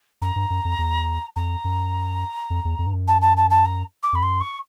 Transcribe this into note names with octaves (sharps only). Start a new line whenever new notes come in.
F#2 A#5
G2
F#2
F2
E2
F2 A#5
F#2
F2
E2
F2
G2
F#2
A5
A5
A5
A5
A#5
D6
F2 B5
F#2 C6
C#6